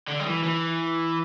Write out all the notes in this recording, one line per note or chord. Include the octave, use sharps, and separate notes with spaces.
D3
G3
E3
E3